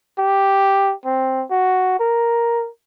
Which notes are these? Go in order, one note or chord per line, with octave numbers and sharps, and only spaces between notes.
G4
C4
F#4
A#4